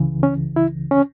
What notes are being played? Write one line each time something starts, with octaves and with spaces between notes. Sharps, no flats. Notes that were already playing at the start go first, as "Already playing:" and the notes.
Already playing: C#2 C#3 E3
C#4
E4
C#4